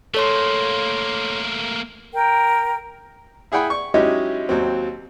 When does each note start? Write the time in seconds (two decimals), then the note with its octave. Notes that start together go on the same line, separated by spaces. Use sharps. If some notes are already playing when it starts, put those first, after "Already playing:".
0.14 A3 A#3 A4 C#5 C6
2.13 A#4 G5
3.52 E4 G#4 F#5 G5 B5
3.70 C#6
3.94 F#3 G#3 C#4 D#4 E4 G4
4.49 D#2 F#3 C4